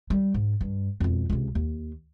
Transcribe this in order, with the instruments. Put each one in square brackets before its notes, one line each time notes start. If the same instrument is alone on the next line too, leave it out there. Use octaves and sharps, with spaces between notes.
[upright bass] G3
G#2
G2
E1 F2
C#2 C3
D#2